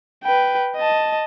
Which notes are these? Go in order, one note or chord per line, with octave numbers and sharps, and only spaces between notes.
B4 G5
D#5 A5